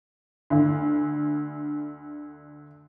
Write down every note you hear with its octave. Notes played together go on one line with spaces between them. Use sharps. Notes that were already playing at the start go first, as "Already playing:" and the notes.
D2 D3